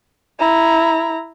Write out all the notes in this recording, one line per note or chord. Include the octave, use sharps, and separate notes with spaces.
E4 A#5